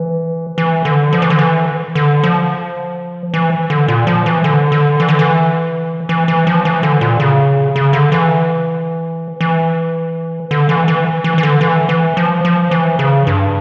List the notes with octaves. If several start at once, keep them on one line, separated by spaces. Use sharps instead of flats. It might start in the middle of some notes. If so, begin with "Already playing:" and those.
Already playing: E3
E3
D3
F3
E3
D3
E3
D3
F3
E3
D3
A#2
F3
E3
D3
D3
E3
D3
E3
E3
E3
F3
E3
D3
A#2
C#3
C#3
D3
E3
E3
D3
E3
E3
E3
E3
D3
E3
E3
F3
F3
E3
C#3
G2